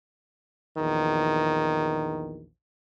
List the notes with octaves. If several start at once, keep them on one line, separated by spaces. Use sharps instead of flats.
A#1 E2 D#3